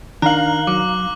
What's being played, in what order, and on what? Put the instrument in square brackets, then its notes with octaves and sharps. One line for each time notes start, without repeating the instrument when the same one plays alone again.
[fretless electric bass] D#3 [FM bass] D4 [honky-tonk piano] F5 A#5 [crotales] F#6 F#7
[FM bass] F#3 [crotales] D6